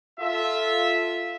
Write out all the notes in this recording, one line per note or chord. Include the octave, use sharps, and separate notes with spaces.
F4 A4 E5